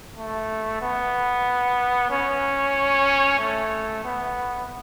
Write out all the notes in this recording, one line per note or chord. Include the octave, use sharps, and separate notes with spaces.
A3
B3
C#4
A3
B3